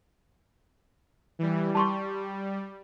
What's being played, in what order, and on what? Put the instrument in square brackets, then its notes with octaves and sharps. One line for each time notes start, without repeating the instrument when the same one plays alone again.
[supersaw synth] E3 G3
[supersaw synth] G3 [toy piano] A5 C6 C#6